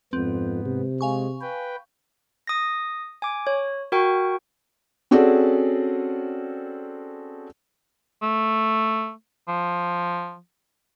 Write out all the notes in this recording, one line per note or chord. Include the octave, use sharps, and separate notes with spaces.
F2 G#2 B3 C4
C3
G#3 F5 G#5 C#6
B4 G5
D#6 A#6
G#5 D6
C#5
F#4 A#4 G5 C#6
C4 C#4 F#4 G#4 A4 D5
A3
F3